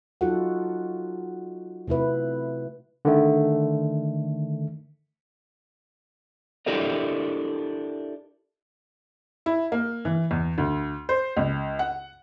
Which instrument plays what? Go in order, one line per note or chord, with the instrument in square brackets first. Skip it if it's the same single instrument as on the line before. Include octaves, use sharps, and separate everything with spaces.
[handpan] F#3 D#4 F4 F#4 A4 F#5
C3 A3 E4 B4
[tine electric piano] D3 D#3 A3
[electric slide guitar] D4 E4 G4 A4 A#4 D#5
[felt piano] E4
A#3
E3
E2
D2
C5
C#2
F#5